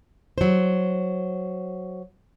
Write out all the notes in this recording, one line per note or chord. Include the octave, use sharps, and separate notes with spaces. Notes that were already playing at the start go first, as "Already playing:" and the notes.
F#3 C5